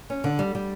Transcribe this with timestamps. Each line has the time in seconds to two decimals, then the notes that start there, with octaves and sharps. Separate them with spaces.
0.10 C#4
0.24 D3
0.39 G3
0.55 G3